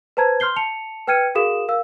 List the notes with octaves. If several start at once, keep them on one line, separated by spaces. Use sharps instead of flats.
B4 C5 A5 A#5 G#6
C6 F6 G6 C7 G7
A5 C#7 F7
B4 G5 F6 G#6 C#7 D#7
F#4 G#4 A#4 F5 D#6 E7
A#4 F5 E6